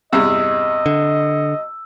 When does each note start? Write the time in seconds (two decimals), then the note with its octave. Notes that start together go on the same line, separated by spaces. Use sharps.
0.13 E2 G2 C3 D#5 E6
0.86 D3